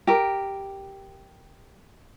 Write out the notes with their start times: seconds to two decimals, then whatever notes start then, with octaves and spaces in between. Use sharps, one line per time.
0.07 G4 A#4